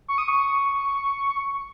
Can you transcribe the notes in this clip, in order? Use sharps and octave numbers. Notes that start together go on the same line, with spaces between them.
C#6
D#6
C#6